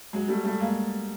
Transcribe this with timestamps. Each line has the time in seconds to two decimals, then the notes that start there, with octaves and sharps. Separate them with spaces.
0.13 F#3 G#3
0.28 G3 A3
0.44 G3 A3
0.59 G#3 A#3